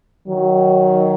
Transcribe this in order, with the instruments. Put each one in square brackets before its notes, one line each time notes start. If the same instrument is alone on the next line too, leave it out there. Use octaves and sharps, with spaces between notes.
[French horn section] D#3 F#3